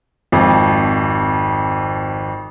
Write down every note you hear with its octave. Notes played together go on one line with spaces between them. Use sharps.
G#1 F2